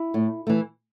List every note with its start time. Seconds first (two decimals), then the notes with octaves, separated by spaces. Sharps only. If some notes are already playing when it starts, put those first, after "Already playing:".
Already playing: E4
0.14 A2
0.47 E3 A3